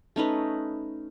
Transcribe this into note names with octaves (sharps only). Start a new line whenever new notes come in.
A3 C#4 D#4 B4